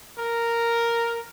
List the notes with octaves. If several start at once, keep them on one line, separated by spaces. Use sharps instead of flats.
A#4